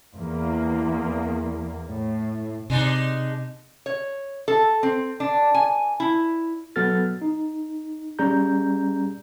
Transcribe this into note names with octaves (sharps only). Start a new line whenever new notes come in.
E2 A#3
A2
C3 G#3 D4 D#4
C#5
A4
C4
D4
G#5
E4
F#3 B3 F#4 A4 F6 A6
D#4
G3 C#4 G#4 A#5 G6